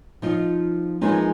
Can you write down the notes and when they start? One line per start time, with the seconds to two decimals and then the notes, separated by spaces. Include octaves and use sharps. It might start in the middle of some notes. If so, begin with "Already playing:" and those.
0.22 F3 D#4 F4
1.01 E3 F3 G#3 A#3 D#4 F4